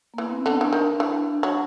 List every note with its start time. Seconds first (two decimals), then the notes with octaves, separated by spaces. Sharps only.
0.14 A#3
0.18 E3 B3
0.29 C4
0.38 C#4
0.46 D3 D4
0.61 E3
0.73 D#3
1.00 E3 D4
1.43 F#3